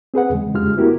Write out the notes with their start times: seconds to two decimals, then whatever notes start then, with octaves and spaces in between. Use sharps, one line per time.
0.14 C4 G#4 B4 F#5
0.30 E2 C#3 G#3
0.54 F2 C#3 G#3 F4 G4 F6
0.77 A3 B3 E4 F#4 G4 A#4